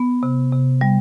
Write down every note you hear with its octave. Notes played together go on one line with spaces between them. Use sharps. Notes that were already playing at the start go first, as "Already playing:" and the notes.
Already playing: B3
C3
C3
G3